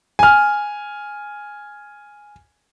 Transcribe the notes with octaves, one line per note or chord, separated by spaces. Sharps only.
G#5 F6